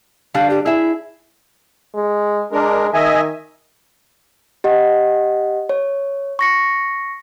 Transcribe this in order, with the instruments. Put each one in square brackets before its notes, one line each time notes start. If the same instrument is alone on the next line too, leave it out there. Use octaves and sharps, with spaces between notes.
[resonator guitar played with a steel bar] D3 G3 D4 [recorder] F5
[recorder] G4
[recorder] E4 [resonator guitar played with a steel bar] G#4 E5
[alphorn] G#3
[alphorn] G#3 [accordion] D4 A#4
[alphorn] D#3 [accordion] D#5 E5 G#5
[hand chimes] G4 D#5 F#5
C#5
C#6 A#6 C#7